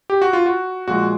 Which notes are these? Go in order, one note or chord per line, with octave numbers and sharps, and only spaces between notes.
G4
F#4
F4
F#4
A#2 F3 G#3 F#4